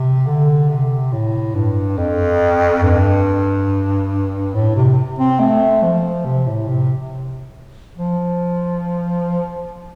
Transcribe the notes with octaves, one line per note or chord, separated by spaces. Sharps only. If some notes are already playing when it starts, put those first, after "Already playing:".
Already playing: C3
D3
C3
A2
G2
F2
G2
A2
C3
C4
A3
F3
C3
A2
C3
F3